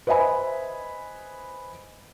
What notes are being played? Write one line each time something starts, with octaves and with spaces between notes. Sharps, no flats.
B4 C5 D#5 E5 G#5 B5